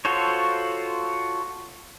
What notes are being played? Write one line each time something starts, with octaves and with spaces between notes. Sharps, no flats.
F4 F#4 A4 C5 C#5